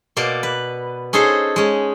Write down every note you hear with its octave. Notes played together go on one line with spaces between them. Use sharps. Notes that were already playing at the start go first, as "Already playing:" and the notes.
B2 A#3 D5 C6
B4
C#4 D#4 G#4 A4 C5
G#3 C#4